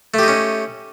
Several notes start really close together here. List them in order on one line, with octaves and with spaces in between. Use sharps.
A3 G4 D#4 C#4